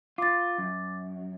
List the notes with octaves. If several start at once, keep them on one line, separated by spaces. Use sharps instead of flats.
F4 D6 A6
F#2